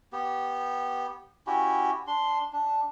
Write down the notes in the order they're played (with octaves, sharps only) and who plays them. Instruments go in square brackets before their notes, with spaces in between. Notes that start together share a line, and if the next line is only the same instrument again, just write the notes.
[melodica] B3 G4
C#4 E4 F#4 G4
D4 C6
D4